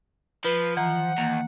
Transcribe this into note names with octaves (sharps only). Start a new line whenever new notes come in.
F3 B4
D#3 E3 F#5 A#5
D#2 A#3